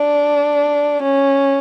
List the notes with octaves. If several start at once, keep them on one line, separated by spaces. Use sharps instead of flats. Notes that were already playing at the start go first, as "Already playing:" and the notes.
Already playing: D4
C#4